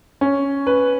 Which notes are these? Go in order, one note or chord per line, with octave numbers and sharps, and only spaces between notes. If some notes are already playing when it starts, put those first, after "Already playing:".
C#4
B4